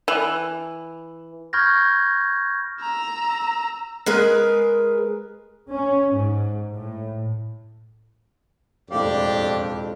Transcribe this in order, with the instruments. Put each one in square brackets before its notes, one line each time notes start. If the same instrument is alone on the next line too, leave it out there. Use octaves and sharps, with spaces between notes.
[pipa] E3
[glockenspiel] B5 C#6 F6 G6 G#6 A#6
[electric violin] A#5 E6
[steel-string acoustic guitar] G#3 G#4 A#4 B4
[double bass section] C#4
G#2
A2
[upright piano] E1 A2 F5 [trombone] F2 [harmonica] D4 G4 D5